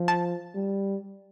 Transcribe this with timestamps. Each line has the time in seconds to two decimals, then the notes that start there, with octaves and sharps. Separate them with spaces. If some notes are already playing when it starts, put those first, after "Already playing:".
Already playing: F3
0.08 A5
0.55 G3